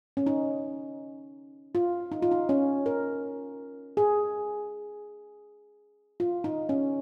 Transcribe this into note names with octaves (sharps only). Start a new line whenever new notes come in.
C#4
D#4
F4
D#4
F4
D#4
C#4
A#4
G#4
F4
D#4
C#4